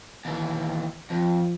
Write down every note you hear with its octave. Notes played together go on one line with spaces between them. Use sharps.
D#2 E3
F2 F3